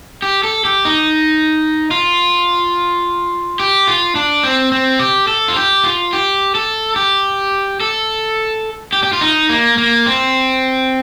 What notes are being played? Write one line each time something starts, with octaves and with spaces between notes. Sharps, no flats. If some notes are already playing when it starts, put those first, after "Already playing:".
G4
A4
G4
D#4
F4
G4
F4
D4
C4
C4
G4
A4
F4
G4
F4
G4
A4
G4
A4
G4
G4
F4
D#4
A#3
A#3
C4